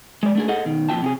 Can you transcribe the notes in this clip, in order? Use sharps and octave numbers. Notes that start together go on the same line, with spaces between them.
G#3 D5
A3 D4 G#4
G#4 A4 D#5 F#5
B2 D#3
F2 A#2 F4 G5 A5
C3 G4 G#4